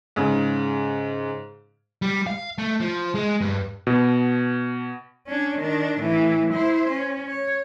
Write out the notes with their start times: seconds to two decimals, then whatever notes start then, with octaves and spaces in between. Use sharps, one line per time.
0.16 G#2 C#3
2.02 G3
2.27 F5
2.58 A3
2.80 F3
3.14 G#3
3.41 G2
3.87 B2
5.27 C#4 D4
5.59 D#3 D4
5.99 A2 E3
6.53 E4 C5
6.89 C#4
7.28 C#5